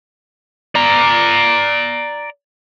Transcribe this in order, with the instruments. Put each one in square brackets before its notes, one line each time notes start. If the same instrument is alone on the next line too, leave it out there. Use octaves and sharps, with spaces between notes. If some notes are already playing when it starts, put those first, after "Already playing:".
[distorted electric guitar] D5 A#5